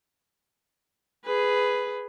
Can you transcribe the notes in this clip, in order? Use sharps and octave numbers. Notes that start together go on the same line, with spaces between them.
G#4 B4